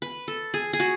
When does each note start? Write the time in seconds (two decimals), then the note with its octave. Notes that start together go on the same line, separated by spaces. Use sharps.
0.02 B4
0.28 A4
0.54 G#4
0.73 G#4
0.80 F#4